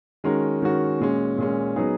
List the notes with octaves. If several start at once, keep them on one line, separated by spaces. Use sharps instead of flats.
D#3 G#3 C#4 F#4 A#4
D#3 G#3 C#4 F#4 A#4
A#2 G#3 C#4
A#2 G#3 C#4
F#3 B3 D#4 G#4